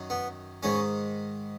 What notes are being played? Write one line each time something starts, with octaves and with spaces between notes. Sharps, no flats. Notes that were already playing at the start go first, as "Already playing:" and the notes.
Already playing: F#2 D#3
B3
G#2 D#3 C#4